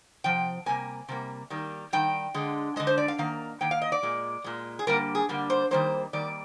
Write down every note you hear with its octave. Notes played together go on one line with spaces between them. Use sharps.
C3 F3 G5
C3 G3 A#3 G#5
C3 G3 A#3
D#3 G3 A#3
D#3 G3 G5
D3 G#3
D3 G#3 D#5
C5
D5
F5
D#3 A#3 F5
D#3 A#3 G5
F5
D#5
D5
A#2 G#3
A#2 G#3
G#4
D3 G3 A#3 A#4
G#4
D3 G3 A#3
C5
D#3 G3 A#3 C5
D#3 G3 A#3 D5